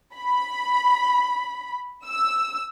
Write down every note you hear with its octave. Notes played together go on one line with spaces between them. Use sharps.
B5
E6